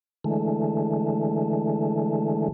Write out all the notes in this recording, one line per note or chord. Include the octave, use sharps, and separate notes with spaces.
D3 E3 G#3 A3